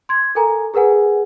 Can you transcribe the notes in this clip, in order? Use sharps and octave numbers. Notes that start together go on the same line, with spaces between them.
C6 G#6
A4 A#4 G#5 A#5
G#4 A#4 B4 F#5 G#5